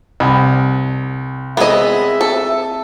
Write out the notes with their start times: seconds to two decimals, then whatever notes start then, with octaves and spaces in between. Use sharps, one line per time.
0.20 C2
1.57 G#3 B3 C4 G#4 D#5 E5
2.21 A4